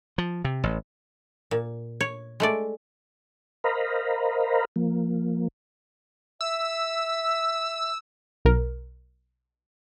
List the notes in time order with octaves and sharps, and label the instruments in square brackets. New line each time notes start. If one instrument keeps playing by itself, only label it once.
[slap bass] F3
C3
A1
[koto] A#2
C#5
G#3 A3 D5
[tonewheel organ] A#4 C5 D#5 F5 A#5 B5
F3 A#3
[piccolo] E5 [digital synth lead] E6
[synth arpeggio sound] B1 A#4